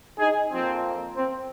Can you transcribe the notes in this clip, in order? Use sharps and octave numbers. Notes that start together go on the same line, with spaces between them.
D#4 G#4
F2 F3 A#3 C4
C4